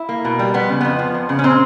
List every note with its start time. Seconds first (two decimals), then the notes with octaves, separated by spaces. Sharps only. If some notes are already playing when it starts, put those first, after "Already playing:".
Already playing: E4
0.09 A#3
0.25 B2
0.39 G3
0.54 F2 B3
0.69 C#3
0.81 F2 B3
0.99 F3
1.14 F2
1.29 C#3
1.39 C#4
1.44 A#2 C4